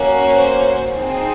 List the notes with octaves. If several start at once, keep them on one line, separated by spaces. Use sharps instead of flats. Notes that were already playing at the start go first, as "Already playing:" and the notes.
Already playing: A#3 C#4 F#4
C5
C4 D#4 G#4